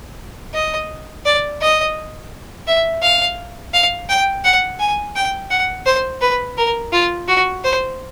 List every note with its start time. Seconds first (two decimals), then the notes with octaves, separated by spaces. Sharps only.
0.54 D#5
1.26 D5
1.61 D#5
2.68 E5
3.02 F5
3.74 F5
4.09 G5
4.45 F#5
4.80 G#5
5.16 G5
5.50 F#5
5.86 C5
6.22 B4
6.57 A#4
6.93 F4
7.28 F#4
7.64 C5